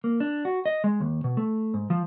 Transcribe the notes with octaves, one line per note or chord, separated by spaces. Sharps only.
A#3
D4
F#4
D#5
G#3
D#2
B2
A3
G#2
F3